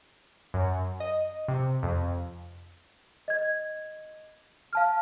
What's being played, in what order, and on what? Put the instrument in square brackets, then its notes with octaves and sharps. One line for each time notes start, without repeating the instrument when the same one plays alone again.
[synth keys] F#2
D#5
C3
F2
[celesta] D#5 G#6
F5 A5 F6